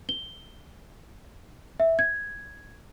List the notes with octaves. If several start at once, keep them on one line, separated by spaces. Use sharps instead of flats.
G7
E5
G#6